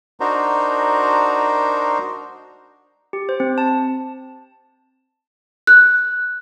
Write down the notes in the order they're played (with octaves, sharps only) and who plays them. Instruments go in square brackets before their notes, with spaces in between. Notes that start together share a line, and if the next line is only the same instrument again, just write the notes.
[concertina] D4 D#4 F#4 A#4 C5
[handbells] G4
C5
C4
A5
[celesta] F#6